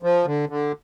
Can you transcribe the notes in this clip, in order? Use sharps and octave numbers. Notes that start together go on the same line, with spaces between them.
F3
D3
D3